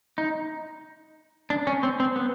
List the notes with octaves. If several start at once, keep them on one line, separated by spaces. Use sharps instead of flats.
D#4
D4
C#4
C4
C4
B3